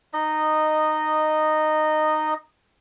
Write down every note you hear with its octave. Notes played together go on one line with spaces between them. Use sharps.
D#4 D#5